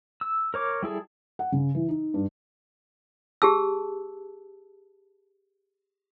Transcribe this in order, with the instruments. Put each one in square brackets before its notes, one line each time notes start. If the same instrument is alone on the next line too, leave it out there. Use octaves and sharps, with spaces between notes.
[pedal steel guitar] E6
A#4 C#5 D6
G3 E4 G#4 A4
[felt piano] F#5
C#3
E3
D#4
G2
[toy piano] G4 G#4 A5 E6